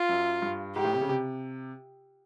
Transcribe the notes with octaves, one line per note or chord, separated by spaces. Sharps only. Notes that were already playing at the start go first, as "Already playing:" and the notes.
Already playing: F4
F#2
G2
G#2 G4
A2
C3
C#3
C3